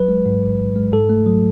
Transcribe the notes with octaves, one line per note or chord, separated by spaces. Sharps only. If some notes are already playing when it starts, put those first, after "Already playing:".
Already playing: A1 F#3 B4
G#3
G#2
A1
A1
G#3
G#2 A4
A3
F#3